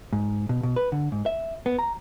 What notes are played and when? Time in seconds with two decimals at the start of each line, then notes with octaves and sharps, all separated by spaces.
0.13 G#2
0.49 B2
0.63 B2
0.76 B4
0.92 D3
1.12 G#2
1.26 E5
1.66 B3
1.79 A#5